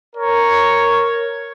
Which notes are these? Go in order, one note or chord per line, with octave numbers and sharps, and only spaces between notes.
A#4 C#5